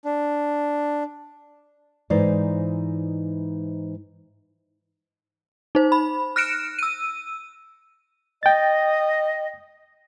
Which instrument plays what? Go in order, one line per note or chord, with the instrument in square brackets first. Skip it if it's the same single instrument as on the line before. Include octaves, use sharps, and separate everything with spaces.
[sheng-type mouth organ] D4
[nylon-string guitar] G#2 E3 D#4 C5 D5
[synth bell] D#4 C5
B5
F6 F#6 A#6 C#7 D7 E7
E6 D#7
[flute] D#5 [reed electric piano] G5 A6